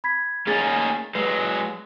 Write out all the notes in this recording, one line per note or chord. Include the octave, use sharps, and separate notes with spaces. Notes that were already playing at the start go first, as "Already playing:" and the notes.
B5 G#6 B6
A#3 C#4 D#4 G#4 A6
F#3 G#3 B4 G#5 C7